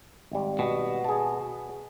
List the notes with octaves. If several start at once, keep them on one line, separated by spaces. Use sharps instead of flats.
G#1 G3
B2
G#4 A5